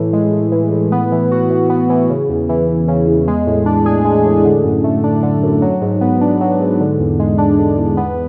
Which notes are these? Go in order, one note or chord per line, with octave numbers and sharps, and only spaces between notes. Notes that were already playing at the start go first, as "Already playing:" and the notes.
Already playing: A2 E3
G#3
A2
E3
A2
B3
E3
F#4
E3
B3
E3
C#3
E2
E3
E2
C#3
E2
G#3
A2
D4
G#4
G#3
A2
D3
F#2
A3
D4
D3
F#2
F#3
G#2
B3
D4
F#3
G#2
D3
E2
G#3
D4
D3
E2
B3